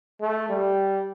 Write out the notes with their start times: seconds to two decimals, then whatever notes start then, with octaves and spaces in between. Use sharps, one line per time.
0.21 A3
0.49 G3